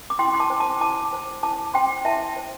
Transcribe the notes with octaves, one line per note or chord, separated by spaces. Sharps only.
D6
E4 G5 C6
C6
A5 D6
C5
A5 D6
E4 A5 D6
C5
E4 A5 D6
C5 G5 C6
E4 E5 A5
C5